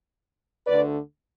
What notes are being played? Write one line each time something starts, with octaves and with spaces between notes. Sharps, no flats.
D2 D3 A3 D4 B4 D5